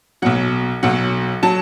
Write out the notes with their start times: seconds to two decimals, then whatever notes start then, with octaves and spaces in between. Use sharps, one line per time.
0.22 B1 B2 F#3 F#5
0.83 B1 B2 F#3 F#5
1.43 F#3 A5